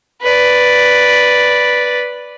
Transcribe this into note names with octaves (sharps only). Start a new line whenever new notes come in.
B4 D5